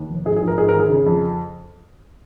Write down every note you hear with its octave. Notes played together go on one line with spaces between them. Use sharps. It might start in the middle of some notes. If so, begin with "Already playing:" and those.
Already playing: D#2
F1
G#2 G#4
G#4
A#1
A#4
G#2 G#4
A#4
G#1
G#4
C#3
F2